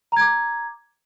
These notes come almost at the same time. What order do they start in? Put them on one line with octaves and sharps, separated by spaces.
A#5 G#6 D6